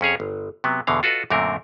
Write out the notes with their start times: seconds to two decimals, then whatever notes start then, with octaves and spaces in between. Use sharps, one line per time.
0.01 F2 C#4 G#4 C#5
0.20 G1
0.64 C3 F#3 B3
0.87 E2 B2 D3 F5
1.03 F4 F#4 A4 B4 D#5
1.30 F#2 A#2 D3 A3 C4 A#4